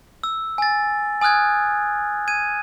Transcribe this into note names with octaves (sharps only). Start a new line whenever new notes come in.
E6
G#5 A6
G#5 D#6 F6 F#6 G#6
G#6 D#7